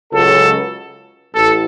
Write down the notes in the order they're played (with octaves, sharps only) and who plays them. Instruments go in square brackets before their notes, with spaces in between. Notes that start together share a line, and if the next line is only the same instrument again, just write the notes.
[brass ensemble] C#2 C#3 F#3 A4
A1 A2 A4